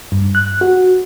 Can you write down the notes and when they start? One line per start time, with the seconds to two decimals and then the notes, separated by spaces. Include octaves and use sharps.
0.12 G2
0.35 F#6
0.61 F#4